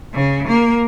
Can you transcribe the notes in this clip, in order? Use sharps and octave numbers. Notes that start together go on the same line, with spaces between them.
C#3
A#3